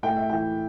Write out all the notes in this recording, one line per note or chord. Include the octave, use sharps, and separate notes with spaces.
A2 G5
E5
E3 G5